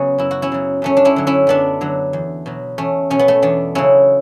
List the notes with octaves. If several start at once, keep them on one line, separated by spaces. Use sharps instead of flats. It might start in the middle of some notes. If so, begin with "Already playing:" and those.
Already playing: C#3 F#3 B3 C#4
F#2 E4
F#4
C#4 E4
C#3 F#3
F#2 A3 C#4
D4
C#4 E4
D3 F#3
C#4 E4
F#2 B3 D4
D3 F#3
E2
B2 F#3
E2 A3 C#4
B2 F#3 C#4
B3
A3 C#4
E2 B3 D4
C#3 F#3 C#4 E4